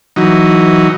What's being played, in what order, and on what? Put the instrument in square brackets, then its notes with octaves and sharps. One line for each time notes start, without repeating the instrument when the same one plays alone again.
[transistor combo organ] E3 F#3 D#4